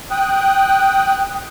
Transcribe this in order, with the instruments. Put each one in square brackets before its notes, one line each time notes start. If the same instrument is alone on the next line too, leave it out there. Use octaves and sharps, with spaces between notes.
[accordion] G5 D#6 F#6